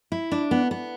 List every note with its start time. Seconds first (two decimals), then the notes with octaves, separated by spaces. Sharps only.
0.12 E4
0.32 D4
0.51 B3
0.71 B3